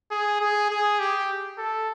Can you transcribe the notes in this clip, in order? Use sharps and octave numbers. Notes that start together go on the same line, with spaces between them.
G#4
G#4
G#4
G4
A4